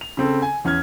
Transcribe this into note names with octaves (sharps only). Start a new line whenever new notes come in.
F7
C#3 C4 A4
G#5
E2 C#4 F6 G#6